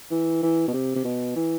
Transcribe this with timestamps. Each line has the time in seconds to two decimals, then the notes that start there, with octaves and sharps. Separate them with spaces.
0.11 E3
0.42 E3
0.68 B2
0.73 C3
0.95 C3
1.04 B2
1.36 E3